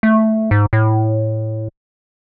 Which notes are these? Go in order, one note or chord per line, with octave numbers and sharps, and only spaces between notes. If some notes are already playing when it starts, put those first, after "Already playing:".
A3
G#2
A2